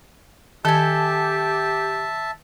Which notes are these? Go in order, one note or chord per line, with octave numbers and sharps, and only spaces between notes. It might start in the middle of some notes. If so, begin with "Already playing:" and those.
D#3 G4 A4 E5 G#5 A5